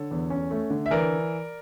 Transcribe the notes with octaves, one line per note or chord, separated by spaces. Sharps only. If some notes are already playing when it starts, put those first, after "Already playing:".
Already playing: D3 A4 C#5
E2
C#4
A3
D3
E5
E3 A#4 D5